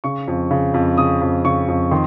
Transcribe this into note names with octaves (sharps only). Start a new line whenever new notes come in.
C#3 C#6
F2
C#3
F2
C#3 D#6
F2
C#3 C#6
F2
D#3 C6